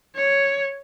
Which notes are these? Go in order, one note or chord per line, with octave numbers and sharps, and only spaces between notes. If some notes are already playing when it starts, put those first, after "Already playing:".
C#5